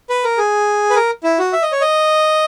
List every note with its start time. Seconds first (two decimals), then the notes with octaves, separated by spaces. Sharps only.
0.10 B4
0.24 A#4
0.38 G#4
0.90 B4
0.96 A#4
1.23 E4
1.39 F#4
1.53 E5
1.62 D#5
1.72 C#5
1.81 D#5